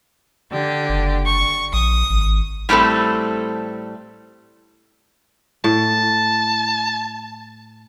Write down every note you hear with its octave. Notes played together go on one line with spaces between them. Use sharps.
D3 G4
F#1
C#6
A#1 D#6
G#1
A2 G3 A3 C4 A4
A2 A5